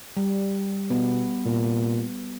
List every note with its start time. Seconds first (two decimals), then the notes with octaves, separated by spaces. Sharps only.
0.17 G3
0.90 B2 B3
1.46 A#2